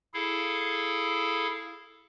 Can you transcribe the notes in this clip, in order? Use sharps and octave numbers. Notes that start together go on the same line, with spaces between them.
E4 G#4 A4 F5